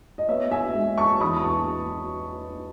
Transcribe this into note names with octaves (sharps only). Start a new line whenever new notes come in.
D#5
B3 C#5 E5
E5 G#5
G#3
A5 C#6
E2 B5 D#6
A5 C#6